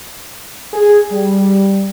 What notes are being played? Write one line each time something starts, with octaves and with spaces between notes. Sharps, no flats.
G#4
G3